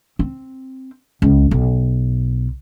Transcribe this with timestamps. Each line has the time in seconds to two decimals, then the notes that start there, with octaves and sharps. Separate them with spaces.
0.19 C4
1.22 C#2
1.51 B1